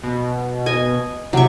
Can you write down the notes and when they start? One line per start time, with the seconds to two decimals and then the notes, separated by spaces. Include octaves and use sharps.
0.03 B2
0.66 D#5 G#5
1.33 C3 F#3 C#6